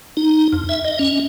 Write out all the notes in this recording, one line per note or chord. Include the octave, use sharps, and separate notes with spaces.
D#4
F2
E5
D#5
C#4